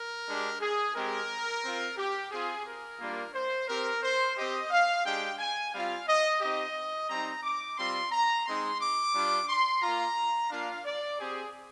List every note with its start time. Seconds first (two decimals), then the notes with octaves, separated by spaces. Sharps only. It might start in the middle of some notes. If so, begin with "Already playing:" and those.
Already playing: A#4
0.28 G#3 D4 G4
0.61 G#4
0.95 G#3 C4 G4 A#4
1.64 C4 F4
1.98 G4
2.31 C4 F4 G#4
2.66 A#4
3.00 G3 A#3 D4 F4
3.34 C5
3.68 C4 G4 A#4
4.03 C5
4.37 C4 G4 D#5
4.71 F5
5.05 G#3 D4 G4 G5
5.39 G#5
5.73 G3 C4 F4 F5
6.08 D#5
6.41 C4 D#4 G4 D#5
7.10 G3 C4 D#4 A#5
7.43 D6
7.77 G3 C4 F4 C6
8.12 A#5
8.46 G#3 C4 D#4 C6
8.81 D6
9.14 G3 D4 F4
9.49 C6
9.82 A#3 F4 A#5
10.50 A#3 D4 F4 F5
10.85 D5
11.18 C4 G4 G#4